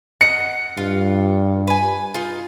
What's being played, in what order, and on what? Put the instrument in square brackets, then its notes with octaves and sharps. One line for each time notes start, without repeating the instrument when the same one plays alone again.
[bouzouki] D#5 F#5 [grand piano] C#7
[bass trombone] G2 [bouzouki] F4
[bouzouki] B4 G#5
D#4 F4